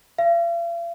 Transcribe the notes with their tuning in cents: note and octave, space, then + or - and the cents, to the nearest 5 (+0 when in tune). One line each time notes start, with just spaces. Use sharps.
F5 -45